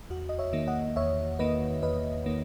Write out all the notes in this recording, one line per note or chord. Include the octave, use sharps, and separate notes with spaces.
E2 F#4
D#5
C#5 E5
D#3 A#3
D#5 F#5
E2 C#5 E5
D#3 A#3 B4 D#5
E2 B4 D#5
D#3 A#3